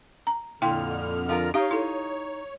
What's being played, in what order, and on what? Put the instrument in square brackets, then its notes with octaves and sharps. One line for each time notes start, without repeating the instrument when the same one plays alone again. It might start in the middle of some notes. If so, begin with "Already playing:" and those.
[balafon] A#5
[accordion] F2 D3 F6 [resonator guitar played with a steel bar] A#2 [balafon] E4 G5
[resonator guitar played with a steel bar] F3 F4 A#4
[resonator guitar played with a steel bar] D#4 F5 [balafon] G4 [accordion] C#5
[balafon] E4 A4